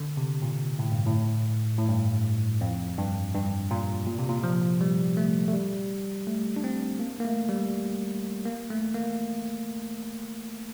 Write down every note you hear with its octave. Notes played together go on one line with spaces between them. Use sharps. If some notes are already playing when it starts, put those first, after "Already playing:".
Already playing: D3
C3
A#2
A2
G2
A2
A2
G2
F2
G2
G2
A#2
A#2
C3
A#2
F3
G3
A3
A3
G3
A3
D4
C4
A#3
A#3
A3
G3
A#3
A3
A#3